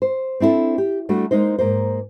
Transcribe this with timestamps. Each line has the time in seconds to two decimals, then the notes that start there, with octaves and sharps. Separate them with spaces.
0.02 C5
0.40 C4 D4 E4 G4 A4
0.78 G4
1.09 G3 A3 D4 F#4
1.31 G#3 A#3 D#4 C5
1.59 G#2 A#3 C5